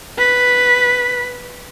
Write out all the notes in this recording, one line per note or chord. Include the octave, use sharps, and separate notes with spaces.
B4 B6